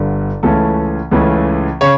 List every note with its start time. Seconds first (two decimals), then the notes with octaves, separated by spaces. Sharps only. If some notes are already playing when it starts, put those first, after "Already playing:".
Already playing: G1 G2 D3
0.43 C#2 C#3 E3 A3 C#4 A4
1.11 C#2 C#3 E3 A3 C#4
1.81 C#3 C#5